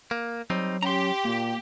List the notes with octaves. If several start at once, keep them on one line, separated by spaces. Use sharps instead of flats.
A#3
F#3 G3 C4 D#4
C#4 G4 A#5 C6
A#2 A#3